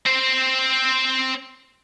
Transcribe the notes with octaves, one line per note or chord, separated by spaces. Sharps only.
C4 C5